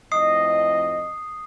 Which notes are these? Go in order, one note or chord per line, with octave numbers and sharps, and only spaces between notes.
F2 A2 D#5 D#6 C7